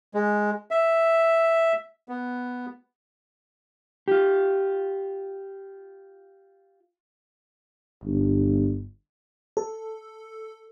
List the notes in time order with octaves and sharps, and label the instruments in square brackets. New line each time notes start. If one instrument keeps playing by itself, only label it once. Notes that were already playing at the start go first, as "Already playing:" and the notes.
[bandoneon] G#3
E5
B3
[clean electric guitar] F4 G4
[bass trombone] G1
[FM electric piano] A4